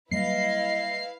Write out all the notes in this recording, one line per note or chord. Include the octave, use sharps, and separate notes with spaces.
F#3 G3 A#3 E4 B4 D#5 F5 C7